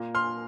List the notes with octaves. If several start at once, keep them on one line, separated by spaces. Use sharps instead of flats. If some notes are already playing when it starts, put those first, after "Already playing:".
Already playing: A#2 A#3
C6 F6